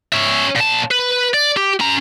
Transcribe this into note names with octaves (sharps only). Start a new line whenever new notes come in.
C#4 E5
A#2 A5
B4
D5
G4
C#4 A#5